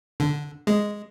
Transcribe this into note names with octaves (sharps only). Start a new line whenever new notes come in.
D3
G#3